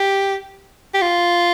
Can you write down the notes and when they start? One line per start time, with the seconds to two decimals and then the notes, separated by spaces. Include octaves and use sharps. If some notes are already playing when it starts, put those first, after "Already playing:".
Already playing: G4
0.94 G4
1.02 F4